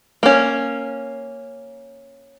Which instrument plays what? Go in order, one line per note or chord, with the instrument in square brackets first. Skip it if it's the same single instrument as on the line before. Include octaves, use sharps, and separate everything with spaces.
[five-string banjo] A#3 C#4